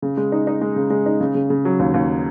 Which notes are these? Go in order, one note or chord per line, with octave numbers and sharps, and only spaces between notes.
C#3
G#3
D#4
D#4
G#3
C#3
G#3
D#4
C#3
C#3
C#3
F#3
D#2
D#2